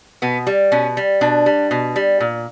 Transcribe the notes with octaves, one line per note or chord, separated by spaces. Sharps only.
B2 B3
G3
B2 C#4
G3
B2 D4
G3
B2
G3
A#2